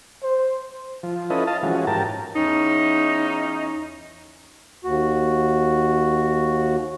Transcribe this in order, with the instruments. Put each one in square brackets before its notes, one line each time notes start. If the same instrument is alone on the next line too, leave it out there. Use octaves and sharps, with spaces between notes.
[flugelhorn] C5
[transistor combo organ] F3
C#4 E4 F4 A4 B4 D#5
D#5 F5 A5
E3 F3 G#3 C#4 F#4
G#2 G4 A#4 A5
[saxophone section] E2 C#4 D#4
[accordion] D#2 F#4